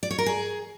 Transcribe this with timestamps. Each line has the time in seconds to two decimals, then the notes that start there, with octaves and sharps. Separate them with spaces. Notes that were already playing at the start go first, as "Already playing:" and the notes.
0.03 D5
0.11 C#5
0.18 A#4
0.26 G#4